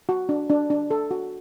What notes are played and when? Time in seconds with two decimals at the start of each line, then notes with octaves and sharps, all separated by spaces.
0.09 F#4
0.29 D4
0.49 D4
0.70 D4
0.91 A4
1.11 F#4